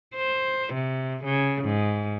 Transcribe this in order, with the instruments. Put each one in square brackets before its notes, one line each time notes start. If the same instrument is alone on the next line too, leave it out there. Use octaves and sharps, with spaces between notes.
[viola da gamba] C5
C3
C#3
G#2